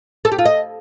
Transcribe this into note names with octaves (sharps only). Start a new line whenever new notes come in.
A4
G4
F4
D#5